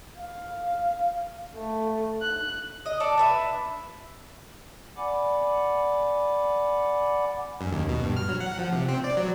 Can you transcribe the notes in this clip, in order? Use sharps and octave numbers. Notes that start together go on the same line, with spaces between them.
F5
A3
F#6
D#5
A4 D5
D4 B4 E5
D5 F#5 G#5 B5 D6
F#2
D#2
B2
G2
F6
F#3
F#5
F3
C3
C4
D5
F#3